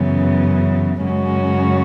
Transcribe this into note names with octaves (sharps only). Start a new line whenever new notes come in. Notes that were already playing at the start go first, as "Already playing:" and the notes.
Already playing: F#2 C#3 E3 B3
F#2 C#3 G#3 C#4 F#4